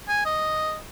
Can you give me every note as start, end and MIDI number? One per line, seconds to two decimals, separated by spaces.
0.09 0.22 80
0.25 0.77 75